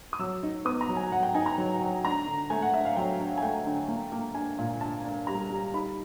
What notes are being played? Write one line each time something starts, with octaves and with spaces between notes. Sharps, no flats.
D#6
F#3 E6
D#4
B3 D#6
A#5
F#3
G#5
F#3 F#5
G5
D#4 G#5
A#5
F#3
F#3
D4 A#5
D3
A3 G#5
F#5
D4 E5
F5
F#3 G5
D4
G#5
A3 G5
D3
A#3
A#3
D4 G#5
A#2
D4 A5
D4
G3 A#5
G3
D#4 B5